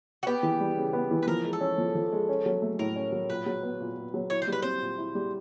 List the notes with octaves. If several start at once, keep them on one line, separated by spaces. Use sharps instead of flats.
F#4
B3 G4
E3
G3
C#3
B3
E3
B4
F3 A#4
G#3
A4
C#4
F3
F3
G#3
C#4
F#3
A3
A2 A#4
C#4
F#3
A#2 B4
F#3
B3
A#2
A#2
F#3
E4 C#5
C5
G3
B4
C4 C5
A#2
E4
G3